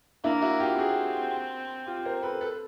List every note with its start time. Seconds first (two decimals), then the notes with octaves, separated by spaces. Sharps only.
0.24 A#3 D4 E4
0.42 E4 F#4
0.60 F4 G4
0.78 C4 F#4 G#4
1.87 F4 G4
2.05 A#4 C5
2.23 A4 B4
2.41 A4 B4